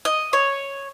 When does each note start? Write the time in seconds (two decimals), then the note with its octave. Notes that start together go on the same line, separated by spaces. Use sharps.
0.05 D#5
0.33 C#5